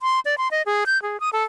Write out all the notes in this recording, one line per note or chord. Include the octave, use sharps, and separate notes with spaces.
C6
D5
C6
D#5
G#4
G6
G#4
D#6
A4